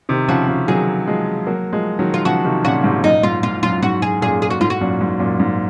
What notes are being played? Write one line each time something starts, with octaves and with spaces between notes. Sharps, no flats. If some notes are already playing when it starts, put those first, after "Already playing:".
C3 D#3
C#3 F3 F#4
C#3 F3
D#3 F#3 G#4
F3 G#3
F#3 A#3
F3 G#3
D#3 F#3
F4
C#3 F3 F#4
C3 D#3
A#2 C#3 F#4
G#2 C3
F#2 A#2 D#4
G#2 F4
G#2 F4
F#2 F4
G#2 F#4
G#4
F#2 A#2 G#4
G#4
F#4
G#2 F4
F#4
F#2 A#2
G#2
F#2 A#2
G#2